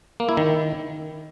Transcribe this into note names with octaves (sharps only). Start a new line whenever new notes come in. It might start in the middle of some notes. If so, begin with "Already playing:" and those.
A#3
E4
D#3